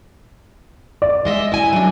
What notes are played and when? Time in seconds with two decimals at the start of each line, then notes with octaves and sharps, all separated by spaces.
1.02 D5
1.25 G#3 D#5 E5
1.52 E4 G#5
1.73 F#3 D4